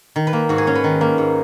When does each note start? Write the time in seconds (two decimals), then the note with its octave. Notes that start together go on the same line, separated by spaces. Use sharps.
0.16 D#3
0.27 B4
0.33 A#3
0.49 G#2 F#4
0.58 G#4
0.67 C#4 C#5
0.75 B4
0.84 D#3
1.01 A#3
1.18 G#2